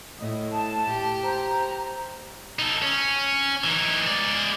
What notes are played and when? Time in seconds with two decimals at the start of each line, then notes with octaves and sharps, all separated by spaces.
0.19 A2 D#5 D#6
0.50 A5
0.90 G4
1.23 C5 A#5
2.59 D#4 A4
2.82 C#4
3.64 E3 D#4
4.07 G#3 D5